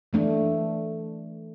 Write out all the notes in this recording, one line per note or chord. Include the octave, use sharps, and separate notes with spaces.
E3 A3 D4